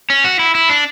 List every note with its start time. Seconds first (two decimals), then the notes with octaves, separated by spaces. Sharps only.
0.10 C#4
0.24 F#4
0.39 E4
0.55 E4
0.70 D4